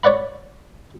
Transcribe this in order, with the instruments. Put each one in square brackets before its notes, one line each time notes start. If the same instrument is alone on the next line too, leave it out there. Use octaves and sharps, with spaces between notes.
[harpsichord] C#5 D5 F#5 B5